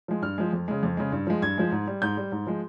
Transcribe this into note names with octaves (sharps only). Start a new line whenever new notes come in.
F3 G#3
G2 F6
F3 G#3
F2
C#3 G#3
F2
C#3 G#3
G2
F3 G#3
G2 G#6
F3 G#3
G#2
G3
G#2 G6
G3
G#2
F3 G#3